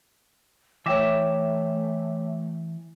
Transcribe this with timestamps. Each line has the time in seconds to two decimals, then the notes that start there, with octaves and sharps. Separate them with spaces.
0.86 E3 A3 C#5 E5 G5 D6